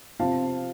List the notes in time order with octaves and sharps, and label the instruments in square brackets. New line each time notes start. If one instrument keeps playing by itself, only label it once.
[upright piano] C3 F3 C4 F5 A5